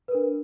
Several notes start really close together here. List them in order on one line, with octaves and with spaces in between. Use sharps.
B4 A#4 D4